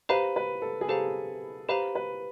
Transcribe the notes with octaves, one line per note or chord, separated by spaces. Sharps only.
G4 B4 C5 F5 A#5
B4
A4
G#4
G4 A4 C5 F5 A#5
G4 B4 C5 F5 A#5
B4